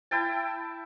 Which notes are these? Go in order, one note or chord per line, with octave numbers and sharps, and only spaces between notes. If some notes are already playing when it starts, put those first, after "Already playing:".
E4 G5 A5